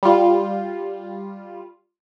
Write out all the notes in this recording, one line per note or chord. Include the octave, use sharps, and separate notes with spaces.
G3 F4